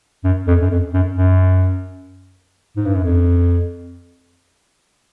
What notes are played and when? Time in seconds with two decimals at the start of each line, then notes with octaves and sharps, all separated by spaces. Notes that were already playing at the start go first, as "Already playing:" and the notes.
0.24 F#2
0.47 F2
0.61 F#2
0.71 F2
0.94 F#2
1.17 F#2
2.77 G#2
2.86 G2
2.95 F#2
3.04 F2